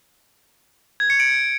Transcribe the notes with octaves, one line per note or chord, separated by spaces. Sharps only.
G#6
C#7
D7